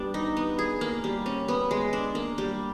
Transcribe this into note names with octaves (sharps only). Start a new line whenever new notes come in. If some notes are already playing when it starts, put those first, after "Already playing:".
Already playing: G3 B3 D4
D#4
B3
G#4
A#3
G3
C#4
B3
G#3
D4
A#3
G3